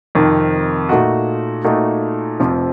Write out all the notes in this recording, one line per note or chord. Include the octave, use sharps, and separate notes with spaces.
F2 C3 D#3
A#2 A3 D#4 F#4
A#2 A3 D#4 F#4
F1 F2 C3 F3